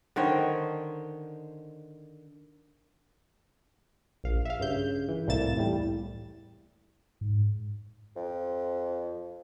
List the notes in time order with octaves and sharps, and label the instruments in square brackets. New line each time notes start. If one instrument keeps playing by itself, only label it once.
[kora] D3 D#3 C5 C#5
[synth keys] A#1 F5
E5 F5
G2 C#3 G6
E3
C2 A2 A#3 E4 A6 E7
E2 A2 G3
[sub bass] G#2
[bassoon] F2